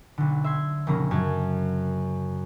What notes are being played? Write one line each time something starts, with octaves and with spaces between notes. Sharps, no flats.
B1 D3
E5 C6 G#6
F1 A#1 C#3 A#3 C#4 A#5
F#2 A5 G#6 E7